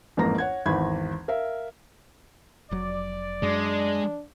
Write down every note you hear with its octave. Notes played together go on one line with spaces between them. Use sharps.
A1 F2 G#2 A#3 A#5 A#6
C#5 F#5 G#6
G#1 E2 B5 G#6
A#4 E5 F5
F1 F#3 D5
F#2 G#3 D4